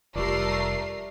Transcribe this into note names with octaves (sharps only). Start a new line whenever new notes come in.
F1 G3 A3 F4 G4 A#4 D5 C7